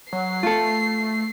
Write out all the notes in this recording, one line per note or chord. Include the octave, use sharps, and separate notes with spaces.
F#3 C7
A3 F4 A4